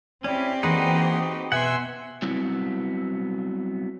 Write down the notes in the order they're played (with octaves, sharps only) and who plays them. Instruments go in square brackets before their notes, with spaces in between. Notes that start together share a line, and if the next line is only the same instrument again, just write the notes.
[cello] C4 G4 [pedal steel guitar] C#4 E4 [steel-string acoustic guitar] D5
[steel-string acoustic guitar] E3 A#3 [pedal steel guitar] D#4 F#4 B4 [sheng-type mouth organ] G#4 F#5 C6
[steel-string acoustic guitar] B2 [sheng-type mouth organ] E5 G#5 E6 [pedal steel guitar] F#5 C6
[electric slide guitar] F#3 G3 B3 C4 E4